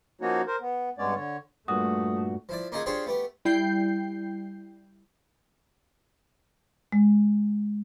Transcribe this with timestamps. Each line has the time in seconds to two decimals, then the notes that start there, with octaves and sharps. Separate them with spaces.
0.21 F3 A#3 C#4 D#4 F#4 C#5
0.47 A#4 C5
0.61 B3
0.98 G2 G#3 B3 C#4 C#5 D5
1.16 D3 C#5
1.68 G2 A#2 A3 F#4 D#6
2.49 F3 E4 D5
2.72 A#3 C#4 D#4 F4 G#4
2.86 D4 F4 G4 G#4 C5 C#5
3.06 A3 B3 G4
3.45 G3 E4 G5 G6 C7
6.92 G#3